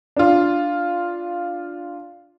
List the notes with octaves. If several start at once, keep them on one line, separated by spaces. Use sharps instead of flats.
D4 F4